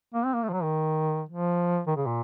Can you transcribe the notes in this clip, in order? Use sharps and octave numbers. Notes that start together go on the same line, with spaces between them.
A#3
C4
A#3
A3
F3
F#3
D#3
F3
D#3
C#3
A#2